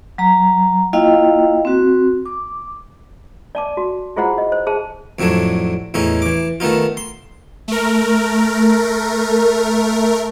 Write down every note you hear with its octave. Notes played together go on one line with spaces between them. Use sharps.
F#3 A#5
A#3 E4 F4 D#5 F5 G5
C4 F#4
D6
D5 A5 D6
F#4
E4 F4 G#4 C5 F#5 A#5
D#5
C5
G#4 C5 A5
F2 A2 F#3 A3 D4
E2 A2 C#4 D#4
E3 D6
D#3 A3 B3 D#4 F4
C6
A3 A#4